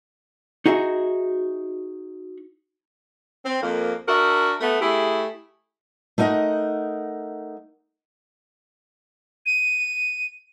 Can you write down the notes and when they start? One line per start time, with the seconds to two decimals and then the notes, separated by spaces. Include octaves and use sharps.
0.66 D#4 F#4 G#4 D#5 E5
3.45 C4
3.62 F2 A#3
4.08 D4 F#4 A#4 E5
4.60 A3 B3
4.80 A3 E4 G4 G#4
6.18 A3 D#4 A#4 D#5 F#5
9.46 D#7